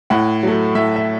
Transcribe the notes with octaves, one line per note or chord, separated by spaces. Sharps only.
A2 F#5
F#3 A3
A2 E5
E5